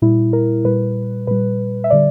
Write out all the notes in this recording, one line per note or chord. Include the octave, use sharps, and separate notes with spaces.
A#2 G3 E4
A#4
A#2 G3 B4
A#2 G3 B4
E5
D3 G3 D5